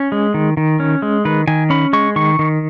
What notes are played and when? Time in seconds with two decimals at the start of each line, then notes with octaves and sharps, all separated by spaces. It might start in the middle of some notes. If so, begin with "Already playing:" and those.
Already playing: C#4
0.12 G#3
0.34 D#3
0.57 D#3
0.80 C#4
1.02 G#3
1.25 D#3 B4
1.47 D#3 G#5
1.70 C#4 B5
1.93 G#3 C#6
2.16 D#3 C#6
2.39 D#3